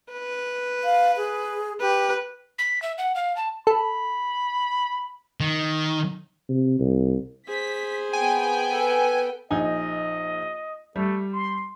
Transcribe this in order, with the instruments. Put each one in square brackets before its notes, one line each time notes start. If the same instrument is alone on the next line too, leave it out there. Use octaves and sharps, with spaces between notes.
[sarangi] B4
[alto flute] F5
G#4
[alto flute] G4 [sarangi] B4
[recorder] B6
E5
F#5
F5
A5
[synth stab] A4 [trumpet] B5
[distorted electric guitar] D#3
[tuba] C3
C2
[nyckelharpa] G#4 C5 [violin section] B6
[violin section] B3 G5 [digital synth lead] G#5
[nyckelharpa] A4 [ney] B4
[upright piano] A#1 D#4 G#5 [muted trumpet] D#5
[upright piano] G3 [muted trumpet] A3
[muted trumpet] C6